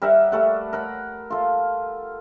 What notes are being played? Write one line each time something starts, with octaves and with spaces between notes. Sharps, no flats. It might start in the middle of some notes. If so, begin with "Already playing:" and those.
G3 A#4 E5 F#5
G3 A3 A4 F#5
A#4 F#5 B5
F4 A4